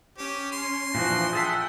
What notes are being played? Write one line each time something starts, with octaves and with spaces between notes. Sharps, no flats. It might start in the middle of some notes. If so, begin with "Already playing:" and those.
C#4 G4
C6
A#2 E3 F3 D4 F#4
G#4 A4 E5 F#5 G5